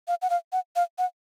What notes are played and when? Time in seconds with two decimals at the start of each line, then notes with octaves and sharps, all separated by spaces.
0.08 F5
0.22 F#5
0.30 F5
0.53 F#5
0.76 F5
0.98 F#5